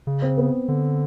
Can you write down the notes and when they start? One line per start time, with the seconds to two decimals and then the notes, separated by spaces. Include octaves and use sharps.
0.07 C#3
0.22 C4
0.38 B3
0.68 D3